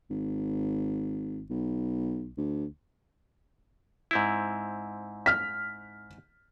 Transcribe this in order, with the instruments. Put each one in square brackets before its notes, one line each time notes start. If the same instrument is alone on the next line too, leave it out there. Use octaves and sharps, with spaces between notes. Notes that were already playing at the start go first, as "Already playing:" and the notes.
[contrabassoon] G#1
B1
D2
[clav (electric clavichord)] G#2 C4 E4
[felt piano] F6 B6